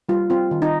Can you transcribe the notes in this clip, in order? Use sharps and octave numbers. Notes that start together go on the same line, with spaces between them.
G3 F4
C4 F4
D#3
D#4